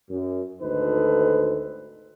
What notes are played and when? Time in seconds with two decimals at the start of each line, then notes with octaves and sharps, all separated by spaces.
0.10 F#2
0.61 G#1 D2 D#4 A4 B4 C5